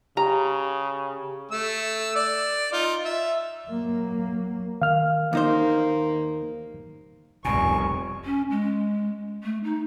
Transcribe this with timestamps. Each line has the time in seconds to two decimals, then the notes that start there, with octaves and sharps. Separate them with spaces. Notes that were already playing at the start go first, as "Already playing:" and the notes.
0.17 C#3 G4 A#5
1.51 A3 E6
2.15 D5
2.72 D#4 F4
3.05 E5
3.69 F#3 A#3
4.82 D#3 F5 F6
5.33 D#2 A#3 D#4 C5
7.45 F1 C2 B2 G#5 C#6
8.25 C#4
8.51 G#3
9.44 A3
9.64 D#4